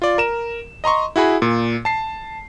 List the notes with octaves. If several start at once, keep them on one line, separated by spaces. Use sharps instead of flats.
F4 D5
A#4 E7
D#5 A#5 C6 C#6
E4 F#4 G#4 B5
A#2
A5 C7